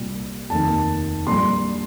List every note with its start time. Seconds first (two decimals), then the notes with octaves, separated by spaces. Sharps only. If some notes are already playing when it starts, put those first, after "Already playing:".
Already playing: C2 A#2 G3
0.50 F1 D#2 D#3 A5
1.27 A#1 A#2 G3 C6